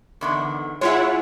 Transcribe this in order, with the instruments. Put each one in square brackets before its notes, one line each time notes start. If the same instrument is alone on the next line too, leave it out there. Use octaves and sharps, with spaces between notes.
[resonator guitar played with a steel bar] E2 D3 D#3
[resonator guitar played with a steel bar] G#3 F#5 [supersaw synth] E4 F4 C#5